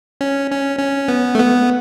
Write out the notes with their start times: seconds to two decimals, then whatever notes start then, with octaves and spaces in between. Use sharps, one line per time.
0.21 C#4
0.51 C#4
0.79 C#4
1.08 B3
1.35 A3
1.39 B3